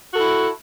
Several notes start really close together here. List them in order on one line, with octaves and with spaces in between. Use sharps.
F#4 A4 E4